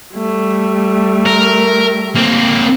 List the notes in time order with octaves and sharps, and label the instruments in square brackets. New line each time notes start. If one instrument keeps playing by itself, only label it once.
[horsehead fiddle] G3 A3
[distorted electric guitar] A#4
A#3 C4